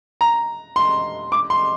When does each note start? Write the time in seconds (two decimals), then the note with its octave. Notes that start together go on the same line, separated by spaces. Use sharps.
0.21 A#5
0.76 C6
1.32 D6
1.50 C6